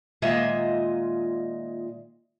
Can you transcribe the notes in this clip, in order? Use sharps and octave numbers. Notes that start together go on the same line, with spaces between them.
A#2 D#3 G#3 F4 D#5 E5